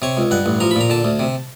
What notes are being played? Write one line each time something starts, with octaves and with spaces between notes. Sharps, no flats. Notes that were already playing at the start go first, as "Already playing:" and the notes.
C3 C#5
C#2
G2 F#5
A1
F3 A#5
B5
A#2 A#5
D3 A5
D2
C3